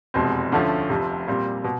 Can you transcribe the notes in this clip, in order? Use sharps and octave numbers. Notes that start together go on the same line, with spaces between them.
F1 E2 B2 G#3 C4
D2 D3 F3 A3 C#4
F1 F2 C3
A#2 G3 C4
B2